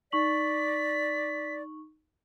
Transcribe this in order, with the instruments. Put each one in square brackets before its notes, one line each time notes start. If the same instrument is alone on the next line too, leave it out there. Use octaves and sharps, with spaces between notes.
[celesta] D#4 C#6 F#7 [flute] D5 [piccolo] B6